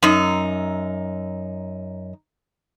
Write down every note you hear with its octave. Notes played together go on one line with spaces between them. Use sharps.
F#2 D#4